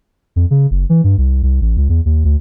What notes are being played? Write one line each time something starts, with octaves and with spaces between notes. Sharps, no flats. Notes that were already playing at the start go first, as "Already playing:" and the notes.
F2
C#3
F#1
E3
G2
C2
C2
A1
C#2
E2
D#2
D2